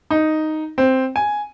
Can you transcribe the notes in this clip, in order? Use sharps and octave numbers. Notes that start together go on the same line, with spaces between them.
D#4
C4
G#5